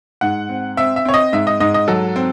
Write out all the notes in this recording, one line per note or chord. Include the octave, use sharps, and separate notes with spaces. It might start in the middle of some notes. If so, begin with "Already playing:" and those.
G#2 F#5
C4
C4 E5
E5
C4 C#5
D#5
G#2 E5
D#5
G#2 D#5
D#5
F#3 A4
C4